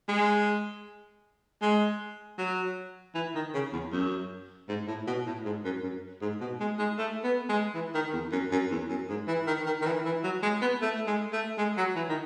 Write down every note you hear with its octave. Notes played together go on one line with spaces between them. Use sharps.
G#3
G#3
F#3
E3
D#3
C#3
E2
F#2
G#2
A2
B2
A2
G#2
F#2
F#2
G#2
B2
G#3
G#3
A3
B3
G#3
E3
D#3
E2
F#2
F#2
E2
F#2
G#2
E3
D#3
D#3
D#3
E3
E3
F#3
G#3
B3
A3
G#3
A3
G#3
F#3
E3
D#3